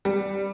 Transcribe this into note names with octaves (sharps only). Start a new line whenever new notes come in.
G3